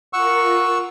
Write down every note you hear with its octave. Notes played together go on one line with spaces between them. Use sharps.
F4 A#4 F#5 C#6 E6